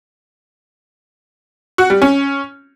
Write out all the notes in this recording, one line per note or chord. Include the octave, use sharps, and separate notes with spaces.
F#4
G3
C#4